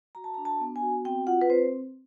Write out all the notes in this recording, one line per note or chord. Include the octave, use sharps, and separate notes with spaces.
F#4 A#5
A5
A#5
D4
A5
B3
G#5
F#4
C4 G5
F4 F#5
B4
C4 C5